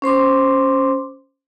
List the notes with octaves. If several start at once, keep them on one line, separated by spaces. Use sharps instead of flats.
C#4 C5 C6 D6